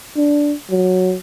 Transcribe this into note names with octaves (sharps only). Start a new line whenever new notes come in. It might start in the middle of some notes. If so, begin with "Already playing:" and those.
D4
F#3